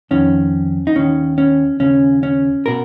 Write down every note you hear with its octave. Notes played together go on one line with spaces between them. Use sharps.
F2 D#3 C#4
D#4
D#2 D#3 C#4
C#4
D#2 C#3 C#4
C#4
B2 A#4